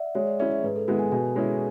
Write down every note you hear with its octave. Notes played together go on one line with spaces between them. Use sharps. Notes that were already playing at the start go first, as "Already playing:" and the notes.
Already playing: D5 E5 F#5
G#3 C#5
D5
C#4 E4 E5
E5
G#2 B4
A4
G#3 B3 E4 B4
G#5
B2 G#5
G#3 C#4 E4